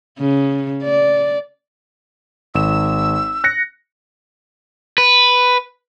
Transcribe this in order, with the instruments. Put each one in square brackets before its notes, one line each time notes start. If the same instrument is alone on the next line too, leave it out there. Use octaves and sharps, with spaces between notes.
[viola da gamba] C#3
D5
[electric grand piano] G#1 E7 [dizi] E6
[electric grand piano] F#6 A#6 C#7
[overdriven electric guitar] B4